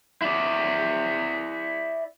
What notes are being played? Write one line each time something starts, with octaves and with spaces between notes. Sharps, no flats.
E4 D5